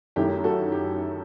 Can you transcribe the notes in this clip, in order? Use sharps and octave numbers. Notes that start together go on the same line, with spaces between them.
F#2 D#3 A3 E4 G4
F#4 A4
G4